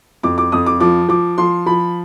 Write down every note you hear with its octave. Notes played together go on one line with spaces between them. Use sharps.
F2 D6
D6
F2 D#6
D6
F3 D6
F3 D6
F3 C6
F3 B5